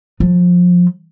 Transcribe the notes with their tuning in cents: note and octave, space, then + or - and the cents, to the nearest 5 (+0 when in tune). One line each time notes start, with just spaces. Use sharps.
F3 +25